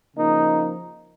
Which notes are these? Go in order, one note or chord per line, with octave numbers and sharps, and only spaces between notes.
C#3 F3 A#3 D#4